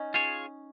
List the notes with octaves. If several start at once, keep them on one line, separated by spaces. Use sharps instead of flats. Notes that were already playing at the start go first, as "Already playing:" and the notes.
Already playing: C#4 D#4
F4 G#4 C#5